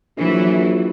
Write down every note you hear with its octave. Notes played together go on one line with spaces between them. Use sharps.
A#1 E3 F#3